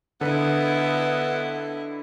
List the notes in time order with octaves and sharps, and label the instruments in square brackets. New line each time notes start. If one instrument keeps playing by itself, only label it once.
[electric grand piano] D3 B4 [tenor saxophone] B3 [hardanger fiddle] E4 D#5